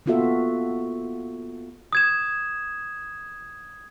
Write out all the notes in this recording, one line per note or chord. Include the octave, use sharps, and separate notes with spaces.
A#3 B3 F4 F#4 A4 E5
D#6 G#6 E7